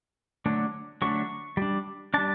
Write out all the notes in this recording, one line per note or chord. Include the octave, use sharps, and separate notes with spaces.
D3 F#3 A3 D4
D3 F#3 A3 D4 C#6
G3 D4
G3 D4 A5